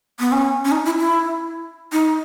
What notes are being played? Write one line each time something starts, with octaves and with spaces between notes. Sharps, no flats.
B3
C#4
C#4
D#4
E4
E4
D#4